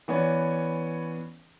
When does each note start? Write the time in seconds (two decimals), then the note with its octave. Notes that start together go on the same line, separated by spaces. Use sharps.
0.08 E3 B3 C#4 C#5 D5